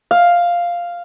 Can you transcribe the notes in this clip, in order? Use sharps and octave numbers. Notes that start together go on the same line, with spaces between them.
F5